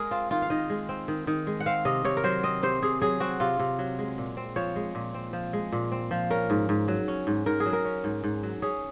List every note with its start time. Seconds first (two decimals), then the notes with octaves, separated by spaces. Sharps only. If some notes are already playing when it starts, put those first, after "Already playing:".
Already playing: G#3 G#4 A#4
0.11 C4 F4
0.31 D#3 F4
0.42 F5
0.50 D#3 D#5
0.70 G#3
0.89 C4
1.08 D#3
1.27 D#3
1.47 G#3
1.60 F#5
1.66 C4 F5
1.85 C3 D#5
2.05 C3 C#5
2.17 A#4
2.24 F#3 C5
2.43 C4 D#5
2.63 C3 C5
2.82 C3 G#4
3.02 F#3 G#4
3.20 C4 F#4
3.40 C3 F4
3.60 C3
3.79 F#3
3.99 G#3
4.18 A#2
4.37 C4
4.56 F3 C#5
4.76 G#3
4.95 A#2
5.14 C4
5.33 F3
5.53 G#3
5.72 A#2
5.92 C4
6.11 F3
6.30 C#4 A#4
6.50 G#2
6.69 G#2
6.88 F#3
7.08 C#4
7.27 G#2
7.46 G#2 A#4
7.60 G#4
7.66 F#3
7.73 A#4
7.85 C#4
8.04 G#2
8.24 G#2
8.43 F#3
8.62 C#4 G#4